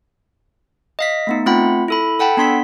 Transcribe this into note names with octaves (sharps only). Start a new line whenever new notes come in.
D#5 F5 B6
A3 B3 D#4
A3 C4 F4 F#5 B5
E4 A4 B5
A4 F#5 G5 A5 B5
B3 D4 C6 B6